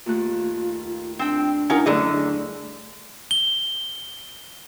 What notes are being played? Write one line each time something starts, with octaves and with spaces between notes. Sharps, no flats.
D#2 A3 F4 F#6
C4 D4 G5
C#4 D#4 E4 A#4 F#5 G#5
F#2 D3 G3 A3 G#4 D5 D#5 A#5
G7